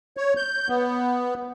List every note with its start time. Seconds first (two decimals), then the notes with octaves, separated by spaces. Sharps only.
0.17 C#5
0.37 G6
0.69 B3